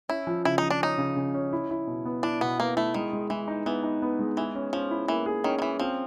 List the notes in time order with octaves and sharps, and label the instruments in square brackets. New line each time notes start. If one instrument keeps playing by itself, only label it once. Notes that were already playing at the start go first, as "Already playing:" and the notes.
[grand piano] C#4 [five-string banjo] E4
[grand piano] F3
[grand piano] C#3 [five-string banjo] E4
[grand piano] F3 [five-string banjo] D#4
[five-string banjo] D4
[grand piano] C#4 [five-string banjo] D#4
[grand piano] C#3
C#3
C#4
E4
E4
B2
B3
[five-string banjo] D4 [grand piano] E4
[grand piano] B2 [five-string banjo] B3
[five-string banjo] A#3 [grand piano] B3
[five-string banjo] A3 [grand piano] E4
[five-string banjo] D#3 [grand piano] G#3
[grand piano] G#3
[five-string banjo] E3 [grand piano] G#3
[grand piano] D#4
[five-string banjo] E3 [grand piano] B3
[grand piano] D#4
B3
G#3
[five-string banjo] E3 [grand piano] G#4
[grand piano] C#4
[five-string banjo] F3 [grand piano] C#4
[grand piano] E4
[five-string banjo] E3 [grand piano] A#3
[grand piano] G#4
[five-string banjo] D#3 [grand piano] C#4
[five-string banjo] D#3
[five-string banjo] E3 [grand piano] C#4
[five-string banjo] F3 [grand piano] C4